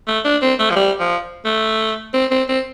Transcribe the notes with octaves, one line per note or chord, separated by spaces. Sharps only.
A3
D4
C4
A3
F3
G3
F3
A3
C4
C4
C4